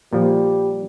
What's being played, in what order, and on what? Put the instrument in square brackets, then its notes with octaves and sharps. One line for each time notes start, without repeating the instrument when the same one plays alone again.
[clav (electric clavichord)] A#2 F3 [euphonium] G3